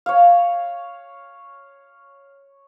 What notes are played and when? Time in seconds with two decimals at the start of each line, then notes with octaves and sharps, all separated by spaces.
0.06 C#5 F5